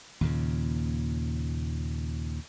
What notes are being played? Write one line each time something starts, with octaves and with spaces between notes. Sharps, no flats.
D#2 A#2 C#3